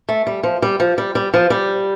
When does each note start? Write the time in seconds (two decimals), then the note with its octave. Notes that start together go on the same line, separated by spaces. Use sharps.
0.09 A3
0.27 G3
0.43 F3
0.62 G3
0.80 F3
0.98 G3
1.15 G3
1.34 F3
1.50 G3